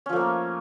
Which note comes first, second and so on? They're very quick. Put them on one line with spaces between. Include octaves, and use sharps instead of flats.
C#4 F3 A3 A#3